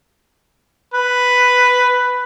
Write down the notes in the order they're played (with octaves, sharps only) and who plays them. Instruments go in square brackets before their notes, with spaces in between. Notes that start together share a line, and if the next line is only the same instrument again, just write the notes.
[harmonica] B4